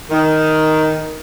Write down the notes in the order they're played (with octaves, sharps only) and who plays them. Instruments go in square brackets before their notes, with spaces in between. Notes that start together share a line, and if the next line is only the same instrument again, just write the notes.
[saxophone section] D#3